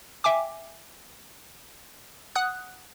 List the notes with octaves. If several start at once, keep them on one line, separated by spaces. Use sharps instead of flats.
E5 G5 G#5 D6
F#5 D#6 F#6